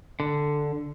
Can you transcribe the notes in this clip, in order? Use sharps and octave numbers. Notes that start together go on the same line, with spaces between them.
D3